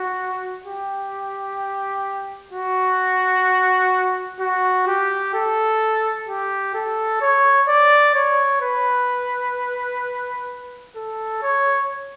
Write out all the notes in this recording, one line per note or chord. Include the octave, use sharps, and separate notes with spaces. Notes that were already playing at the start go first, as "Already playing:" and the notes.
Already playing: F#4
G4
F#4
F#4
G4
A4
G4
A4
C#5
D5
C#5
B4
A4
C#5